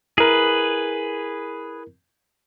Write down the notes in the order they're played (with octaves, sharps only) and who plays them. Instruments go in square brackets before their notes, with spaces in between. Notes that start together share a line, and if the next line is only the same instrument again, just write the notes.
[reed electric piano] E4 A#4 [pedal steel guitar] G#4 B4